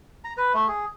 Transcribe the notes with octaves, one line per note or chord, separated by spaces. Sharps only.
A#5
B4
A3
G#4